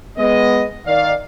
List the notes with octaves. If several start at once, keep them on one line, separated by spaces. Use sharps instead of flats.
G#3 B3 D#5
D#3 D5 F5